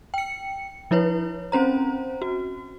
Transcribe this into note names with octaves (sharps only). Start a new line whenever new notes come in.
G5 C#7
F3 E4 B4 C#5
C4 C#4 C5 A#5
F#4